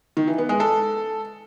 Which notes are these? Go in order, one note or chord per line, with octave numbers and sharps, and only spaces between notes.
D#3
E3
B3
G#3
A4